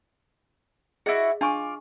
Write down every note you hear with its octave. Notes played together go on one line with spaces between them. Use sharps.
E4 F#4 G#4 D#5
D4 F4 G#5 C#6 D6